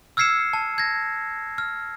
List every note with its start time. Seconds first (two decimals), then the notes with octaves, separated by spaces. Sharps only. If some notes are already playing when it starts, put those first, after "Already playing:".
0.17 E6 F6 G#6 C7 C#7 E7
0.53 A5
0.78 G#6 A#6
1.58 F6